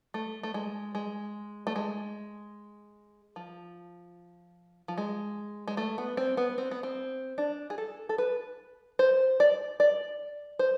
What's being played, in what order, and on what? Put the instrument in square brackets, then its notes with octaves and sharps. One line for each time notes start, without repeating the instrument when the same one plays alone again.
[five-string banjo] A3
A3
G#3
G#3
A3
G#3
F3
F3
G#3
G#3
A3
B3
C4
B3
C4
B3
C4
D4
G#4
A4
A4
B4
C5
D5
D5
C5